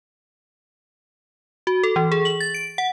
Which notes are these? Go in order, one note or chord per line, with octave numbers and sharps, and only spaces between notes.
F#4
A4
E3
G#4
F#7
A6
D7
F#5